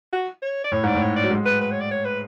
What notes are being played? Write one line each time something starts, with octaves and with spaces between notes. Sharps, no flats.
F#4
C#5
D5
A2 C#5
G#2 D5
A2
C#5
D5
F#3
G#3
B4
B4
C#5
D5
C#5
B4